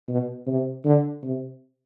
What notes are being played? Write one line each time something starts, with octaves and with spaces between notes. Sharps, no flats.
B2
C3
D3
C3